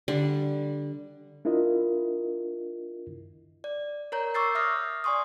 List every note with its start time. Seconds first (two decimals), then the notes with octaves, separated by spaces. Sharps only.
0.08 D3 G3
1.45 D4 E4 F4 A#4 D#5
3.64 D5
4.12 A#4 C#5 A#5 G6
4.34 C#6 D6 E6 G6 A6 C7
4.55 E5 D#6 F6 A#6
5.04 D5 G#5 C6 C#6 D#6